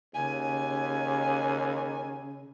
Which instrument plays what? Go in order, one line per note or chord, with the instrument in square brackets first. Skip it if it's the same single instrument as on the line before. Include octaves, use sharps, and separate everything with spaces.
[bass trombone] D#2 [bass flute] C#3 [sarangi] G#5